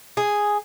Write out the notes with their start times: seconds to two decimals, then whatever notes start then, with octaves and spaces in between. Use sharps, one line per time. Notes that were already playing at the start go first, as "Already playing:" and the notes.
0.17 G#4